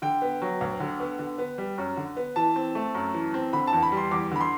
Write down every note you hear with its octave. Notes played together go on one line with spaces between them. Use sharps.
D3 G5
B3
F#3
D2
D3
B3
D3
B3
G3
F#2
D3
B3
E3 A5
C4
A3
F#2
E3
C4
D3 B5
A5
E2
B5
G3
C6
E2 D6
D3 B5
C6